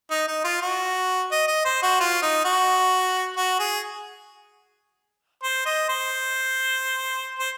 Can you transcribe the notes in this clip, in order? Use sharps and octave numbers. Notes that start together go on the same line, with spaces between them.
D#4
D#4
F4
F#4
D#5
D#5
C5
F#4
F4
D#4
F#4
F#4
G#4
C5
D#5
C5
C5